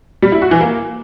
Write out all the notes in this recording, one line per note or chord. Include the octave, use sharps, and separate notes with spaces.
G3
E4
F#4
E3
A#3